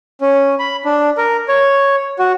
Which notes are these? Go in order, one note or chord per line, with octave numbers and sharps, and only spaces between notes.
C#4
B5
D4
A#4
C#5
F#4